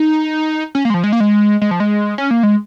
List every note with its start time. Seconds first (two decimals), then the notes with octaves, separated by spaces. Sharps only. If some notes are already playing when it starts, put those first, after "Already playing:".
Already playing: D#4
0.75 C#4
0.85 A#3
0.90 G#3
0.94 F3
1.04 G#3
1.12 A#3
1.20 G#3
1.61 G#3
1.71 F3
1.80 G#3
2.18 C#4
2.31 A#3
2.43 G#3